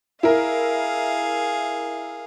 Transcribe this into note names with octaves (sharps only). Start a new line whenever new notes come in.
E4 G#4 A#4 F5